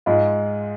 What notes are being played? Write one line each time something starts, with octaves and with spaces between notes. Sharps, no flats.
G#2 G#3 F4